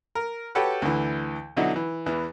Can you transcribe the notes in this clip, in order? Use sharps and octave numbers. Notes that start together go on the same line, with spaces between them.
A#4
F#4 G4 A4 B4 C#5 G5
D2 D3 E3
B2 D3 F#3 D#4 E4 F#4
E3
E2 E3